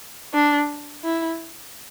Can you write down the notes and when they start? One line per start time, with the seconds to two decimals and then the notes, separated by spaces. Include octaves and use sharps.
0.34 D4
1.04 E4